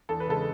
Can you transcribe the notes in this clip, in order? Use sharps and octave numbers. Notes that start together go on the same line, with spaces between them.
E2 A4
B4
C#3 G#3 A4